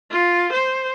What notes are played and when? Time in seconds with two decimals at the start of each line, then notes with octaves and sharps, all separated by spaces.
0.11 F4
0.53 C5